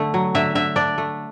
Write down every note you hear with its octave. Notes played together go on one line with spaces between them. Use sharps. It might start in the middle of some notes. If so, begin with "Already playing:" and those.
Already playing: D3 A3
F#3
D3 E5
D3 E5
D4 D5
A3